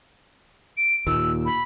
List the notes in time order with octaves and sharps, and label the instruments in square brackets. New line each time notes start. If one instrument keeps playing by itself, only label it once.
[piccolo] D7
[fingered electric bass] D#2 A#2 [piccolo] E6
[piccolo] B5